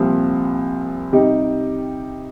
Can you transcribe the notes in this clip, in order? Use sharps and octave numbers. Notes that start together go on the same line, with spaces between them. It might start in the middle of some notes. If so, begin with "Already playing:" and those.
Already playing: C2 A#2 F3 C4
C3 G3 D#4 G4